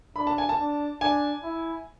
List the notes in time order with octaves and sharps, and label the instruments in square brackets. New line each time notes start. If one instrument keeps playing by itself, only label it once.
[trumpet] D4 [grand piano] B5
[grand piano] A5
G#5
A5
[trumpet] D4
[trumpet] D4 [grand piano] G#5
[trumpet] E4